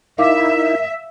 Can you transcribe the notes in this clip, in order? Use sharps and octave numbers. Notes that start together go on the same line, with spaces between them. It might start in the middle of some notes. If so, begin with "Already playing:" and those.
D#4 E4 A#4 E5 F5 D6